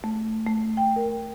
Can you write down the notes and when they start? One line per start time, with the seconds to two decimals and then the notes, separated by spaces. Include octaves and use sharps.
0.04 A3
0.47 A3
0.77 G5
0.96 A#4